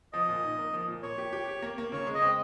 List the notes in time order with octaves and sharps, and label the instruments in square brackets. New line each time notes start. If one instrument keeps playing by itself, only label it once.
[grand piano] F3 [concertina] D#5
[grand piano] A#2
D#4
A#3
F3
A#2
[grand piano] A#3 [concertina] C#5
[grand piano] G4
G4
G4
A#3
A#3
[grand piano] C#3 [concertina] C#5
[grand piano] G#3
[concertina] D#5
[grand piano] C4